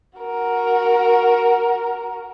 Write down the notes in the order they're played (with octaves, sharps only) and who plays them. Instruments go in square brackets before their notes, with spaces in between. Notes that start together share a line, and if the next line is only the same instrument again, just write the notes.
[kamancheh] F#4 A#4